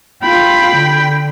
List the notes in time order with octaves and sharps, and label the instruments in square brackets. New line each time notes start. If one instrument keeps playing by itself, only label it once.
[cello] F4 [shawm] G5 [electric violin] B5 B6
[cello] D3